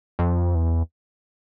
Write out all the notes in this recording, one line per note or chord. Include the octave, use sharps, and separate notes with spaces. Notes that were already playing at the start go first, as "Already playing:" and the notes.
F2
E2